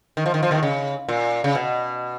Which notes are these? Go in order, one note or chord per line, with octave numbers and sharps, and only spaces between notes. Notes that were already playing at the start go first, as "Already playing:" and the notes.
D#3
F3
D#3
F3
D#2 D#3
C#3
A#2
C#3
B2